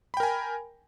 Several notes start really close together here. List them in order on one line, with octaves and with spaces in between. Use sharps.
B5 G5 A#4 G#5